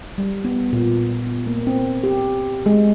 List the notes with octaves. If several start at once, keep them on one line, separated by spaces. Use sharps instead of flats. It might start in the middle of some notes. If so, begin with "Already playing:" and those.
G3
B3
A#2
B3
A#3
C4
G4
G#3